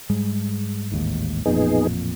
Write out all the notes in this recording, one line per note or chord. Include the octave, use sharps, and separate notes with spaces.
G#2 G3 G#3
A1 D#2 G#2
A1 F2 A#2 B3 D#4 G#4